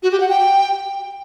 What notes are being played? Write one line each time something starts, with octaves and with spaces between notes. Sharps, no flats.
F#4
G4
F#5
G5